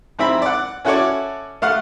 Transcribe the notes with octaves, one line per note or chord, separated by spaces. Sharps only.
G#2 C4 E4 E5 B5
D5 F#5
C#4 E4 F#4 A4 C#5 D5
A3 F5 F#5